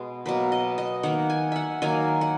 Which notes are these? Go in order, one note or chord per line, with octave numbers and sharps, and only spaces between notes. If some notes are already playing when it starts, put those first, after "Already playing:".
Already playing: B2 G#3 B3
B2 F#3 A#3 B4
D#5
D#5
D#3 A#3 F#5
G#5
E5 F#5
D#3 F#3 A#3 G#5
F#5